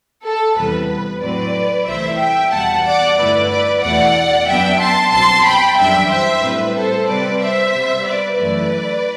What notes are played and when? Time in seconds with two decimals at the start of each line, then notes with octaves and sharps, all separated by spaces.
0.24 A4
0.56 E2 C3 E3 G3 B3 B4
0.90 B4
1.21 A2 F#3 C4 B4 D5
1.87 C2 C3 E3 A3 E4 C5 E5
2.19 E5 G5
2.52 E2 B2 G3 F#5 A5
2.85 D5 F#5
3.17 G2 D3 A3 E4 B4 D5
3.50 B4 D5
3.82 E2 B2 A3 E4 D5 F#5
4.47 F#2 F#3 B3 D4 E5 G5
4.80 A5 C6
5.12 C2 B2 F#3 C4 A5 C6
5.45 G5 B5
5.77 F#2 E3 G3 D4 E5 G5
6.09 C5 E5
6.42 A2 G3 C4 B4
6.75 A4 C5
7.07 C3 G3 C4 B4 D5
7.40 C5 E5
7.73 C3 G3 B3
8.05 B4 D5
8.38 F#2 E3 A3 E4 B4 D5